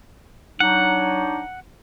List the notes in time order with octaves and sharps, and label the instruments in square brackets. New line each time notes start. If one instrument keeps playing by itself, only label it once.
[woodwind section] F#3 D4 D#4 [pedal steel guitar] F#5